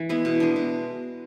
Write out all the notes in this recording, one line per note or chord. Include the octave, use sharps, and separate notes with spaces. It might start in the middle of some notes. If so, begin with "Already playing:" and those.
Already playing: E3
G#3 B3 E4
B2
G#3 D4
B2